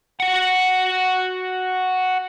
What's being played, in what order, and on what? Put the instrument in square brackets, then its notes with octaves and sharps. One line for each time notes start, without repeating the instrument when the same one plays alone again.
[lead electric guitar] F#4 F#5